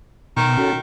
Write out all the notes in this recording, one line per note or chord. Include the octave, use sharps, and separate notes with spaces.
B2 D#3
C#4 F#4 A4